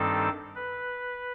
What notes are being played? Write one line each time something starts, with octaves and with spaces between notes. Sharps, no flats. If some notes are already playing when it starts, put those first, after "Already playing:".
Already playing: G2 D#3 G3 C4 D#4 A4
B4